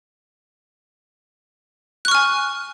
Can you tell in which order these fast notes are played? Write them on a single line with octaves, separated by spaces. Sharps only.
F#6 C#6 F6 G#5